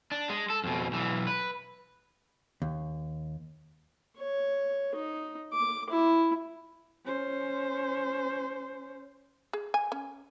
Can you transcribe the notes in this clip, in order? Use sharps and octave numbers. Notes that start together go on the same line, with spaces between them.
D4
G#3
A4
F2 B2
B1 E3
B4
D#2
C#5
D#4
D6
E4
C#4 C5
G#4
G#5
C#4